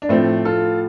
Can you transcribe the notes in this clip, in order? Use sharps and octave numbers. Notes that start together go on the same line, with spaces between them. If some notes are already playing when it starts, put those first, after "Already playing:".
D4
A2 F3 A3 C4
F4 A4